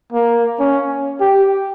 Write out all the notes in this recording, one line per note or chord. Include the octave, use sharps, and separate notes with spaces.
A#3
C#4
G4